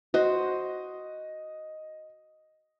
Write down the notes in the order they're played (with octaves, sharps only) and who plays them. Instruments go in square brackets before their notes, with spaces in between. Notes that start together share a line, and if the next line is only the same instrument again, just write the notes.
[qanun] F#4 C5 [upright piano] D#5